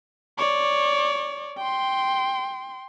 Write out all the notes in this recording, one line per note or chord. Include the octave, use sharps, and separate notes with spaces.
C#5 D5
G5 C6